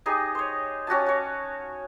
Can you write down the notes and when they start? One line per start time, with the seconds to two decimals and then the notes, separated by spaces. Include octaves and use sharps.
0.06 D#4 G4 G#4 D#5
0.35 C5 C#5
0.87 C#4 F#4 G4 A5
1.06 F#4 C#5